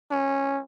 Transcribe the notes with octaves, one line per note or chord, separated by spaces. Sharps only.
C#4